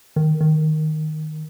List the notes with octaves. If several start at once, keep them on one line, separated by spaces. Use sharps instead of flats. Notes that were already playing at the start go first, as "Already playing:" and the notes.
D#3
D#3